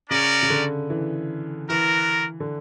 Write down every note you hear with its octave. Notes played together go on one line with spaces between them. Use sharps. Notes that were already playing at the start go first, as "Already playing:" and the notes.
C#3 C#4 F#4 A#4 D5
C#3
D3
E3
E3 B3 F#4 A#4
D3